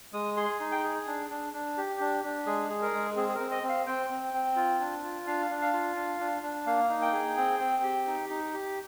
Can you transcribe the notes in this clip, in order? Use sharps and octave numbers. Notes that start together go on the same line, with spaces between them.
G#3 D#6
G#4 C6
D#4
G5
G#4
D4
D4
D4
G4
D4
D4
G#3 G#4
G#4
A#4
G#3
C4 G#4
G#4
A#4
C4
D#5
C4
F5
C4 G5
C4
C4
F4
D4
F4
D4 F5
D4
F5
F4
D4
D4
D4
A#3 F5
D#4
G5
G#4
C4
C4
G4
D#4
D#4
G4